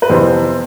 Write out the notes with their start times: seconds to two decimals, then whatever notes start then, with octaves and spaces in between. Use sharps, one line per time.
0.02 B4
0.10 F2 C3 E3 B3 C5